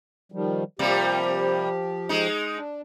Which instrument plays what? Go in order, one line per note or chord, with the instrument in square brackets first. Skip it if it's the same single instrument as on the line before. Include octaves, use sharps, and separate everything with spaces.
[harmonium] D#3 F3 G3
[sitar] C3 G3 A#3 [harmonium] F3 G4
[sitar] G#3 D#4
[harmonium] D4